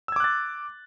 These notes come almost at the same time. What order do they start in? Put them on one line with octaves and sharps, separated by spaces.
E6 G#6 D6 F#6 A6